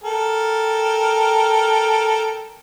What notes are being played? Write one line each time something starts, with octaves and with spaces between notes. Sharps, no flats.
A4 A#4 G5